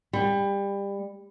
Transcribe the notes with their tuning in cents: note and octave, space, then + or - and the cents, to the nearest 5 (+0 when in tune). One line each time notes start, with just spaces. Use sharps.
G3 +25